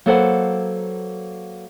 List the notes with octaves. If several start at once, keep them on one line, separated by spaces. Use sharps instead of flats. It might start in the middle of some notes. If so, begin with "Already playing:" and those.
F#3 A#3 A4 B4 C5 F#5